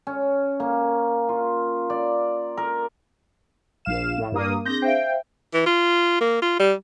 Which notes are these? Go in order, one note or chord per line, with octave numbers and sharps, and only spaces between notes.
C#4
A#3
F4
D5
A#4
A#1 F5 E7
A2
G2 A#3 D#6
C4 D4 G#4 G6 A#6
C5 E5 F5 G5
E3
F4
A#3
F4
G3